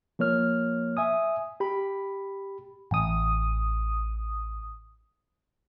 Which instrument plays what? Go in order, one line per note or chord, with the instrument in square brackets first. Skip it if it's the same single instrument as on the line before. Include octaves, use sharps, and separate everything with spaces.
[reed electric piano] F3 A#3 C#5 F6
E5 G#5 D#6
G4 B5
[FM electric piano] A1 D#6